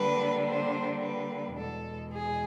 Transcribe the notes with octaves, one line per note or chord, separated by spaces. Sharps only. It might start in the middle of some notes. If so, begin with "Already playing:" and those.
Already playing: D3 G3 A#3 D4 B4
C5
B4
E2 B2 G#3 A4
G#4